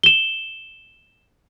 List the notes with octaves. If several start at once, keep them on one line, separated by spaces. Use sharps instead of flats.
E7 G7